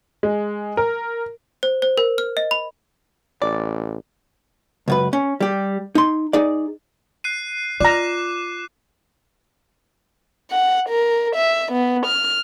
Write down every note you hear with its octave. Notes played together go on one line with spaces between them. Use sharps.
G#3
A#4
C5
C5
A#4
F6
D#5
B5
A1 D5
C#2 F#2 B4
C#4
G3 G4
D#4 C6
D#4 G#4 D5
F#6 C7 D#7
F4 D5 A#5 D6 F#6 E7
F#5
A#4
E5
B3
F6